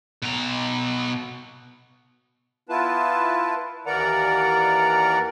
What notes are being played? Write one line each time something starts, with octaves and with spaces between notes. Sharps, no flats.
B2 A#5
B3 E4 F4 B4 A5
D#2 E3 A#4 D5 F#5 A#5